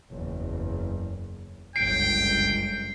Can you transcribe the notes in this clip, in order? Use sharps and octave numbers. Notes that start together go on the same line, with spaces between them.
F#1 E2
G1 C#2 F#2 G5 C7 D7